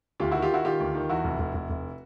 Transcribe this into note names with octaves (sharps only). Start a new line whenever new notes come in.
D2 F4 G4
D#3 E4 F#4
F4 G4
D#3 E4 F#4
D#3 F4 G4
D2
D#3
E2 E4 F#4
F1
F1
F1
F1